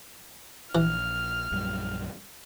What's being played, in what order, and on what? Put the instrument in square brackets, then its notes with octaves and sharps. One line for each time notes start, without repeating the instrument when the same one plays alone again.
[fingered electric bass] A#1 [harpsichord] E3 [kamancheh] F6
[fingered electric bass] A#1 F#2 G3